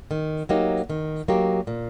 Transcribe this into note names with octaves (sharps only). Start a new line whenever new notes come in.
D#3
F#3 A#3 D#4 G4
D#3
F#3 A#3 D#4 G4
A#2